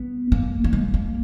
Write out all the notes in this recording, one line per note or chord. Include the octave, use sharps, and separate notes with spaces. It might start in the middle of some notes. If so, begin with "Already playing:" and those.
Already playing: B3
A#3
A#3
G#3
A#3